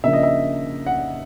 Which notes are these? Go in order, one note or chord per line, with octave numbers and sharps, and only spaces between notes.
C#3 F3 A#3 D4 E5
D#5
E5
F#5